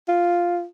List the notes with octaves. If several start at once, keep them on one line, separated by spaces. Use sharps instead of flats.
F4